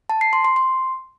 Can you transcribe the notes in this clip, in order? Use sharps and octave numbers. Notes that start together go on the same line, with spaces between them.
A5
C7
C6
C6
C6